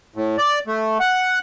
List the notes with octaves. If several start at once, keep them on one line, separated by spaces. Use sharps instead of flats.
A2
D5
A3
F#5